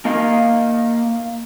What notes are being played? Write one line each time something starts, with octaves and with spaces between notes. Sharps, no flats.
A#3 D#5 F5